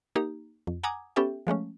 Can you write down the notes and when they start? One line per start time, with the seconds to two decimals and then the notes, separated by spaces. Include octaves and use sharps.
0.15 A#3 D#4 G4 A#5
0.67 F2
0.83 F#5 G#5 A#5 D6 D#6 G#6
1.16 B3 C#4 G4 A4 E5 G5
1.47 F3 G#3 A3 C#4